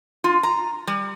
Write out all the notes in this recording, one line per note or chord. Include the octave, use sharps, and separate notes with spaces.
F4
A#5
G3